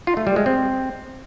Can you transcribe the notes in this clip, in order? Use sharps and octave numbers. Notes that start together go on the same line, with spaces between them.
F4
A3
G3
G#3
C4